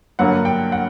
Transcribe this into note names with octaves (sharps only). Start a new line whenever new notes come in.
G2 D3 F#3 A#3 F#5
G5
F#5